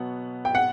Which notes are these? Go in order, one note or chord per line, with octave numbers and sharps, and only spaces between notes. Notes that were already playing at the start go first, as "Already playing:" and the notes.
Already playing: B2 F#3 B3 F#5
G5
F#5